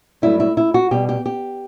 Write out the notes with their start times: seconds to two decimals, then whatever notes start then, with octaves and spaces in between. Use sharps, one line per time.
0.22 G2 F#3 A3 E4
0.40 E4
0.57 E4
0.74 F#4
0.91 B2 G3 G4
1.09 G4
1.26 G4